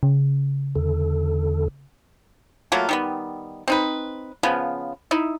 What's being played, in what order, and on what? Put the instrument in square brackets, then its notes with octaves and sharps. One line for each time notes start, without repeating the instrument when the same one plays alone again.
[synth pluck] C#3
[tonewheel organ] E2 D3 A4
[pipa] F#3 A3 A#3 F4
D#3 G3 B3
C4 D#4 B4
C#3 F3 B3
D#4 E4